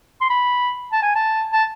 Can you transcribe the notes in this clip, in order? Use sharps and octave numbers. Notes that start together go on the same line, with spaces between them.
C6
B5
A5
G#5
A5
A5